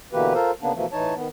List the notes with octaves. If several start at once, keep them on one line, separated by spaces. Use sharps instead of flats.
B2 D3 E3 A#3 G4 B4
F4 A4 A#4 C5
C#3 A#3 B3 D4
B2 E3 F3 A3 A#3
A2 E3 D#4 C#5 A5
D#3 B3